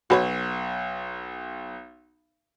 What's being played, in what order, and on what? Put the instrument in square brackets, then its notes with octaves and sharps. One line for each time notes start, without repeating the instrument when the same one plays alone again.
[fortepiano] B1 [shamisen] F#4 B4 C#5